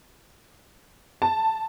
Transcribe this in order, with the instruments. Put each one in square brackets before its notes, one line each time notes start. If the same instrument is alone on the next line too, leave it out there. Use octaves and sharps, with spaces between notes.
[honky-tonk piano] A5